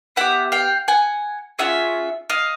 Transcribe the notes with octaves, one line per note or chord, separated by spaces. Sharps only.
B3 E4 G4 E5 F#5
F5 G5
F#5 G#5
C#4 F4 G#4 E5 F#5
D#5 F5